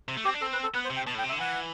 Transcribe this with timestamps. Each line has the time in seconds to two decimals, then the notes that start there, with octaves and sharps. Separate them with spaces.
0.08 C3
0.17 A3
0.25 C4 G4
0.34 D4
0.41 C4 A4
0.53 B4
0.64 A4
0.74 B3 B4
0.85 C5
0.90 C3
0.96 G5
1.07 B2 A5
1.15 A2 G5
1.24 C3
1.29 E5
1.32 D3
1.40 E3 F#5